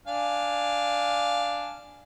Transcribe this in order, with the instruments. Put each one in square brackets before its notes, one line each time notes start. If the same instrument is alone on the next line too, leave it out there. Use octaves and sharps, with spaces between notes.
[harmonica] D4 F5 G#5